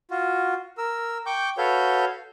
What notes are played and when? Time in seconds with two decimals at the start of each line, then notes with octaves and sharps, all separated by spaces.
0.11 F4 F#4
0.78 A#4 E6
1.26 G5 C#6 D6 G6
1.58 F#4 A4 B4 C#5 F5 G6